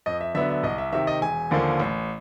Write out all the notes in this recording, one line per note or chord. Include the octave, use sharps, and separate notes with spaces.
F2 D#5
E5
D3 F#3 B3 D4 E5
E5
C2 D#5
E5
C3 D#3 E5
D#5
E1 G#5
D#2 D3 F3 A#3
A1